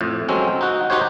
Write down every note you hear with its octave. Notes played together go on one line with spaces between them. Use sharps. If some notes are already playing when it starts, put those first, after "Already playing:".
F2 A2
F#3 G#3 C4 C#4
D#4 F#4
D#4 F#4 G4 C5 C#5